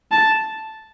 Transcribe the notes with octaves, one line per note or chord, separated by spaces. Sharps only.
A5